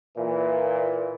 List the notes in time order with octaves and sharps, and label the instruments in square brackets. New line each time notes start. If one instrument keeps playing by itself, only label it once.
[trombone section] A#2 E3